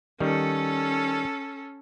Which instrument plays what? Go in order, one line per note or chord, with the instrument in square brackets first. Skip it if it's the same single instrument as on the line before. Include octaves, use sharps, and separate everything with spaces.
[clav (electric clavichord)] D#3 G3 [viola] C#4 A4